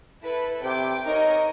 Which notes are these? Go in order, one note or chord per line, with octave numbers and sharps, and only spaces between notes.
E4 A4 B4
C3 G5 D6
D#4 A#4 C#5 D#5